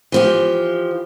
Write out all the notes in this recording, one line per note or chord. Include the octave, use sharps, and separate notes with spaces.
E3 F3 G4